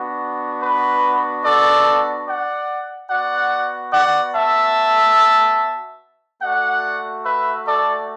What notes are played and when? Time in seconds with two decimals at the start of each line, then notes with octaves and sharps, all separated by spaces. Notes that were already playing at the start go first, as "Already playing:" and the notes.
Already playing: B3 D4 F#4
0.62 B4
1.44 A4 D5
2.27 D5 F#5
3.11 B3 F#4 D5 F#5
3.93 D5 F#5
4.34 E5 A5
6.42 A3 F#4 D5 F#5
7.25 B4 E5
7.67 A4 D5